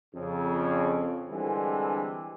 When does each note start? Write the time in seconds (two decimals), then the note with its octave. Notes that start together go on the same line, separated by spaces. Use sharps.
0.15 F2 C#3
1.30 D3 E3 G3 G#3 C4 D4